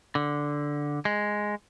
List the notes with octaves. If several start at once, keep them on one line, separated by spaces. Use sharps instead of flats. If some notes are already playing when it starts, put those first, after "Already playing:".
D3
G#3